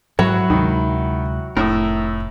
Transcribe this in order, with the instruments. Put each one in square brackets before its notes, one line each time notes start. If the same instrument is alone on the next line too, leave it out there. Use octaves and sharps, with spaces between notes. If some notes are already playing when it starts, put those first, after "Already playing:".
[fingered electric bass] G#2 [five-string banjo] F#3 [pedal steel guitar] E4 F#4
[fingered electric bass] D2 C3 G#3 [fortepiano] D#3
[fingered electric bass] F1 [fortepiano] A2 [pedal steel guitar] A#4 E5 D#6